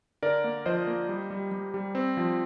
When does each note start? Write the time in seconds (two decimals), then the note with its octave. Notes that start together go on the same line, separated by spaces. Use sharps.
0.23 D3 A#4 D5
0.44 A#3
0.66 F3 C5 D#5
0.87 A#3
1.09 G3
1.30 G3
1.52 G3
1.74 G3
1.95 C4
2.17 F3